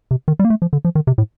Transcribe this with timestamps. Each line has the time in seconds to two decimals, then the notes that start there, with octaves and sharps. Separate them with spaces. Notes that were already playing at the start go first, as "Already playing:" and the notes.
0.11 C3
0.28 D#3
0.39 G3
0.45 A#3
0.50 A3
0.62 F3
0.73 D3
0.85 F3
0.95 D#3
1.07 C3
1.18 A2